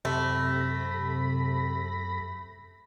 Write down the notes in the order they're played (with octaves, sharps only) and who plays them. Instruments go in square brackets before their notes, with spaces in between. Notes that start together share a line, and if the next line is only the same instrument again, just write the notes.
[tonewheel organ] F#2 A4 A#6 [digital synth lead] C3 [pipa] A3 [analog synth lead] B5